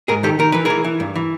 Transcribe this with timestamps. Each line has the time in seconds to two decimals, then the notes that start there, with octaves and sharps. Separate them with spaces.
0.08 G#2 G#4 A#4
0.23 D#3 G4 A4
0.39 D#3 A#4
0.52 E3 B4
0.65 E3 G#4 A#4
0.85 E3
1.00 G2
1.15 E3